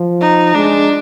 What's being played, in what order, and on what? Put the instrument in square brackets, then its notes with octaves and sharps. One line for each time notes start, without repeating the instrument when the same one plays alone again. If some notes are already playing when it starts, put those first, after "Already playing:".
Already playing: [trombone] F3
[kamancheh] D#4
[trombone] G#3 [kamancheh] D4